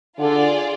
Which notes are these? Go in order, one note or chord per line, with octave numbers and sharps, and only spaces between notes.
D3 F4 G#4 D5